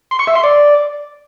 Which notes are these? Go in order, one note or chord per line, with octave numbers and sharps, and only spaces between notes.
C6
C#6
E5
C6
D5